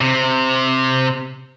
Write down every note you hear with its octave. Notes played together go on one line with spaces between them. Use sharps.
C3